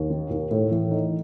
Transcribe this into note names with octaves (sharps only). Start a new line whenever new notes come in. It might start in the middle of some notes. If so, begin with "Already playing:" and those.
Already playing: D#2
D#3
D#2
A2
E3
D#4